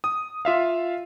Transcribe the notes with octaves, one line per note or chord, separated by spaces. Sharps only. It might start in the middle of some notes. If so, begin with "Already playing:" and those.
D#6
F4 E5 F5